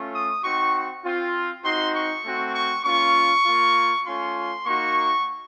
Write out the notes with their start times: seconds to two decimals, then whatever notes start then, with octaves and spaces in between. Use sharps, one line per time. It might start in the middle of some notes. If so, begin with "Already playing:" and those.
Already playing: A3 C#4 F4
0.14 D#6
0.44 C4 D#4 F#4 C#6
1.05 C4 F4
1.65 C4 D#4 F#4 C6
1.95 C#6
2.25 A3 C4 F#4
2.55 C#6
2.86 A#3 C#4 F4 C#6
3.46 A#3 F4
4.06 A3 C#4 F4 C6
4.66 A#3 D#4 F#4 C#6